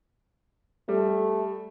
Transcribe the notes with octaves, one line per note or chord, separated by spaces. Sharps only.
G3 A3